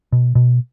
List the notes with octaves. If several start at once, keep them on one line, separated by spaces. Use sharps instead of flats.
B2
B2